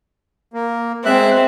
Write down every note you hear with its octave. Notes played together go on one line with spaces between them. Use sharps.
A#3
G#3 C4 E5 F#6